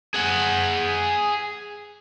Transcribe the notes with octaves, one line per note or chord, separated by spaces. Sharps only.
G#4 F#5